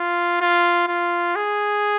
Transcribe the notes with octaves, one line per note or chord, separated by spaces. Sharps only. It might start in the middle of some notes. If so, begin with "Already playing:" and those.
Already playing: F4
F4
F4
G#4